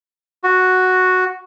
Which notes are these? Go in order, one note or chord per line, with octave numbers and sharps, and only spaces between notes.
F#4